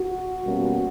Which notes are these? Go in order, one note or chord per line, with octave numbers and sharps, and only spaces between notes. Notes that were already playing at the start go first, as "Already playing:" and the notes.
Already playing: F#4
B2 G3 A#3 C#4